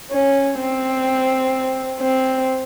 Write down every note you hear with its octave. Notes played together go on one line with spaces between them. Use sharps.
C#4
C4
C4